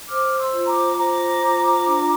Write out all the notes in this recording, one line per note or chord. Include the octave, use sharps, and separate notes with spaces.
C5 D6 F6
C6 E6
F4
A#5 D6
C5 A#5 D6
F4
D4